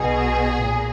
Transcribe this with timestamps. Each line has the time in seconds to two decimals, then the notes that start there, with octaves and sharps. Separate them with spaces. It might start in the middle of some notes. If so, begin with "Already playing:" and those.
Already playing: B1 B2 G#4
0.62 A#2